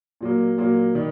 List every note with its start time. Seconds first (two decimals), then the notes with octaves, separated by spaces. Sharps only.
0.21 A#2 F#3 A#3
0.58 A#2 F#3 A#3
0.95 D#3 G3